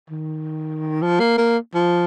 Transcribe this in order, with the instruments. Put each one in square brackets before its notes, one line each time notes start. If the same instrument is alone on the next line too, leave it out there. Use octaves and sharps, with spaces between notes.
[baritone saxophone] D#3
F3
A#3
A#3
F3